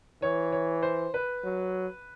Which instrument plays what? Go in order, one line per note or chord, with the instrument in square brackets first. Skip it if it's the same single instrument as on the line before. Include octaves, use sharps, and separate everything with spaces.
[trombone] E3 [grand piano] C#5
[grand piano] C#5
C5
B4
[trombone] F#3